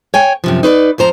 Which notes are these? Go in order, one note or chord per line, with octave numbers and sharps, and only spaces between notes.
C#5 G5 G#5
F#2 C3 F3
D#4 B4 C5 D5
F2 F3 C5 A#5